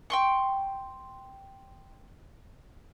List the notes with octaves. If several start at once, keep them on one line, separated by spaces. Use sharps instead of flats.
G5 C6 C#6